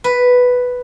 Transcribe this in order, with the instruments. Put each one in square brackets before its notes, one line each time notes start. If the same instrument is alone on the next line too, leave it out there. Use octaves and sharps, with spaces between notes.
[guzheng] B4